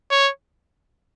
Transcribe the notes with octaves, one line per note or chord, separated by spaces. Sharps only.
C#5